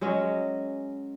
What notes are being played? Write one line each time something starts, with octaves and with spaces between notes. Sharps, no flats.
F#3 G#3 C#4